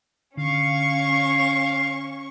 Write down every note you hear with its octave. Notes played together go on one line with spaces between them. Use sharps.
D3 C#4 F5 C#6